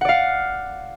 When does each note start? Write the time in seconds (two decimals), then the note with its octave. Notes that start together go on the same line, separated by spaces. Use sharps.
0.01 F#5
0.05 D5
0.09 F5